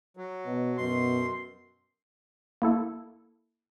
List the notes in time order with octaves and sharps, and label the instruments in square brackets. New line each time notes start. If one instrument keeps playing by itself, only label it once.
[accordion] F#3
[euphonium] B2
[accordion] F#2 C6 [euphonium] B2
[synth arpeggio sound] A#3 E4 A4